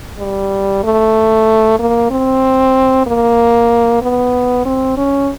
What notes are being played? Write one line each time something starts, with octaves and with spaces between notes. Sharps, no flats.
G3
A3
A#3
C4
A#3
B3
C4
C#4